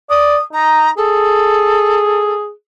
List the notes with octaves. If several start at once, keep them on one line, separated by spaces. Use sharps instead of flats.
D5 D#6
D#4 A#5
G#4 A4